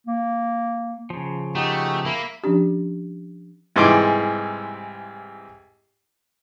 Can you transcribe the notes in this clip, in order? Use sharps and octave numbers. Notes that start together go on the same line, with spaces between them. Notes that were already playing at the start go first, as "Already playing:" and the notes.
A#3
C#3 F3
A3 D#4 F#4 G4
A#3 E5 B5
F3 C#4 D4 G4
C2 G#2 E3 C6 D6